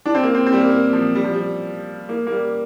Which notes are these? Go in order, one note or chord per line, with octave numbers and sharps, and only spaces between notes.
D4
C4
A#3
C4
C4
G3
A#3
A#3
F3
G3
F3
G3
A#3
A#3
G3